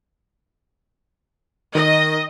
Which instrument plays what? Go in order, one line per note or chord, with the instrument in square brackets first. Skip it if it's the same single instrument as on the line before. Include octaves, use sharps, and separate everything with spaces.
[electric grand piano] D#3 [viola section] D#5